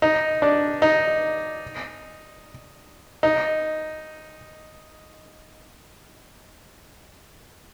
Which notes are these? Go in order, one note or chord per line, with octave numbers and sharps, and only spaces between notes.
D#4
D4
D#4
D#4